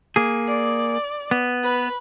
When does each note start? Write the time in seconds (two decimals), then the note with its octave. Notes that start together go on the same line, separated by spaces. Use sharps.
0.16 A#3 G#4
0.48 D5
1.31 B3
1.64 B4